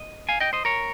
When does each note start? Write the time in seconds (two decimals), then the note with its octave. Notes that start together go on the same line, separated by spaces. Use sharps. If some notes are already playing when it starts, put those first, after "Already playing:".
Already playing: D#5
0.29 F5 G#5
0.40 D#5 G5
0.53 C5 D#5
0.65 A#4 C#5